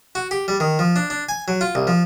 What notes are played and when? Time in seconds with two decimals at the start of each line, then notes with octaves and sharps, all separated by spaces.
0.15 F#4
0.31 G4
0.48 G3
0.60 D#3
0.79 F3
0.96 D4
1.10 D4
1.29 G#5
1.48 F#3
1.61 F4
1.75 C2
1.87 F3